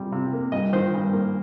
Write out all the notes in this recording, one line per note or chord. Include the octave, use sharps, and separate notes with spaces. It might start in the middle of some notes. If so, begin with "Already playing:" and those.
Already playing: C3 G3
C3
A#3
G2 D#5
D#3 C5
G2
A#3